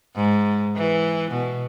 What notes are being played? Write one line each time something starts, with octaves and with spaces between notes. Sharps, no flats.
G#2
E3
B2